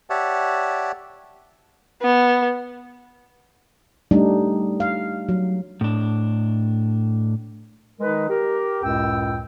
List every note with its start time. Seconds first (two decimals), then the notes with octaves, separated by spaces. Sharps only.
0.10 G4 C#5 D5 E5 F#5 A5
2.02 B3
4.11 G3 A3 D4 D#4
4.80 F5
5.29 F#3
5.81 A2 D4
8.00 D#3 G#3 D#4 A#4 B4
8.29 G4 A#4
8.83 C#2 F#2 A2 G5 E6